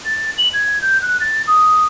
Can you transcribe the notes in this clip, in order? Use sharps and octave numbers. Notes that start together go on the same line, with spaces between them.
A6
F#7
G#6
G6
F#6
A6
D#6